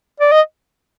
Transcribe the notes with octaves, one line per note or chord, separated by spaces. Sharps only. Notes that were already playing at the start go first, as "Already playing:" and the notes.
D5
D#5